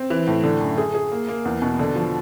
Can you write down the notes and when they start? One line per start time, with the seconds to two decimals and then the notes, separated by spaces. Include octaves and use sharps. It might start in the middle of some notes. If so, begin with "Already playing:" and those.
Already playing: C4
0.10 E3
0.27 A2
0.43 D3
0.61 F#2
0.78 G#4
0.94 G#4
1.12 A#3
1.29 A#3
1.45 E2
1.62 B2
1.79 D3
1.96 F3